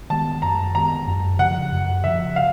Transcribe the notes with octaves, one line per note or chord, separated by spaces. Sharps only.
D#3 G#3 B3 A5
F#2 A#5
D#3 G#3 B3 A#5
F#2
C#3 F3 F#5
F#2
C#3 F3 E5
F5